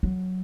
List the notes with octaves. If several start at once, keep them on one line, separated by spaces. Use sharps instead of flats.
F#3